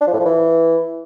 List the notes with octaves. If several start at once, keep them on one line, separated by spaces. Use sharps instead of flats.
D4
F3
A2
F3
E3